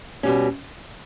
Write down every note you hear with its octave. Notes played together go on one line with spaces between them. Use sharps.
B2 G3 C#4